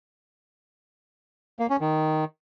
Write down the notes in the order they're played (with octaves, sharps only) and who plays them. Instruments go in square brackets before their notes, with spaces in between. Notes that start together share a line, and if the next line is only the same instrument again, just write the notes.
[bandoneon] A#3
C#4
D#3